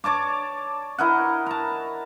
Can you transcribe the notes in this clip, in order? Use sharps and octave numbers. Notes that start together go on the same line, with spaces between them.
C#5 D5 A5 D6
E4 A#4 D#5 F#5
A5 A#5